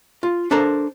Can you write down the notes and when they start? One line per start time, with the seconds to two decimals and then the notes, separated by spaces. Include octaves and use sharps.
0.23 F4
0.51 D4 A4 A#4 C5 A#5